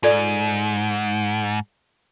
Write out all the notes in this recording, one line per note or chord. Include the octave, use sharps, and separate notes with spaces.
G#2 F4 A4 D5